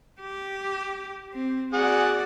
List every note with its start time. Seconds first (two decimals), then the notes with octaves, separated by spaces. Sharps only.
0.21 G4
1.33 C4
1.73 F#4 G#4 D5 F#5